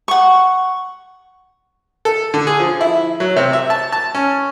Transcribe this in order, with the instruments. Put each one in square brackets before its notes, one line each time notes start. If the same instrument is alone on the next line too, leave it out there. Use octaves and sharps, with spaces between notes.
[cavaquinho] F#5 C#6
[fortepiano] A4
D3
G#4
F3
E4
F#3
C3
E5
A5
A5
C#4